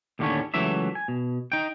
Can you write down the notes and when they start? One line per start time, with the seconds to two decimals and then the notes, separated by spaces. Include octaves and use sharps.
0.19 D#2 A2 D3 G3 A3 C#4
0.54 C#2 E3 F#3 A3 E5
0.95 G#5
1.08 B2
1.52 D#4 G5